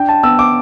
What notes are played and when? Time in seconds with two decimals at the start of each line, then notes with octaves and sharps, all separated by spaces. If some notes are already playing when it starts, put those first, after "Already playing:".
Already playing: D4 G5
0.09 A5
0.23 B3 E6
0.39 D6